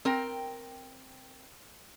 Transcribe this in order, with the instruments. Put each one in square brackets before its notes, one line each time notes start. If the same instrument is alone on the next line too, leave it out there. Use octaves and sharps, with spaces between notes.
[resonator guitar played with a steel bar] C4 A#4 G5